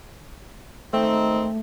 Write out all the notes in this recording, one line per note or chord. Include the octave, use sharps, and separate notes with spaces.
D#3 A3 C4 D#4